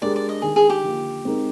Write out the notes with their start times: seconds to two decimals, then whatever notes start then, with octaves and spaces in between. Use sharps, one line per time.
0.02 G#3 D4 G4 A#4 D5
0.16 D5
0.29 D#5
0.42 D#3 G#3 D#4 G#4
0.56 G#4
0.70 G4
0.83 D3 F3 A#3
1.24 G#3 C4 D#4 A#4